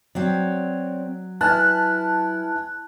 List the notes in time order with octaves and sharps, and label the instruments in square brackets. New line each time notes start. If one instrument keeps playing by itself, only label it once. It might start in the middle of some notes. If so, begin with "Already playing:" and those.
[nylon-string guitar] F#3 [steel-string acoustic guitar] C4 C#5 D5
[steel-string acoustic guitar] E4 [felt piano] B4 G#5 F6 [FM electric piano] A5 F#6